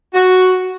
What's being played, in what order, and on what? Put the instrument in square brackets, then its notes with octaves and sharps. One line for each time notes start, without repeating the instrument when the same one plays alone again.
[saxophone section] F#4